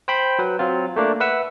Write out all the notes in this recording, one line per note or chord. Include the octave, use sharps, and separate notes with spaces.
C5 G5 B5 C6
F#3 B4
F#3 C4 F4
A3 A#3 D4
B4 E5 F#5 E6